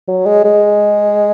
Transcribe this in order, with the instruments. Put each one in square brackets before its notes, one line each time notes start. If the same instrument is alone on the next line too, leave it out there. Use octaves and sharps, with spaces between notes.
[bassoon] F#3
G#3
G#3